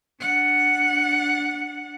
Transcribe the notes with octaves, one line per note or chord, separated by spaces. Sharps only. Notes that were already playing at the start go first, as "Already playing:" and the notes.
D4 F#5